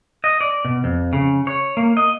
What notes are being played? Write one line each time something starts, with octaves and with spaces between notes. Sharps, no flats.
D#5
D5
B2
F2
C#3
C#5
A#3
D#5